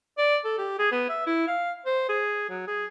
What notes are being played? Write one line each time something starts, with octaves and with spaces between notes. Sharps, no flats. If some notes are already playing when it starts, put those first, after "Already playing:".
D5
A4
G4
G#4
B3
E5
E4
F5
C5
G#4
F#3
G#4